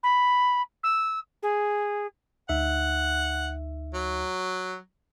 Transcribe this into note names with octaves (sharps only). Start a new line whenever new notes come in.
B5
E6
G#4
D2 D#4 E5 F#5
F#3